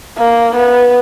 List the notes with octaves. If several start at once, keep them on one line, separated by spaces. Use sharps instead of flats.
A#3
B3